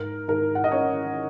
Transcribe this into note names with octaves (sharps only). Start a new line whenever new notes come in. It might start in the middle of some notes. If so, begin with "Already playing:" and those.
Already playing: G#2 A#4
G#2 A#4
F#5
D#5
C#4 C#5